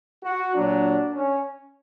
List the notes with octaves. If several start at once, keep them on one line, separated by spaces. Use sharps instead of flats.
F#4
A#2 F#3 D4
C#4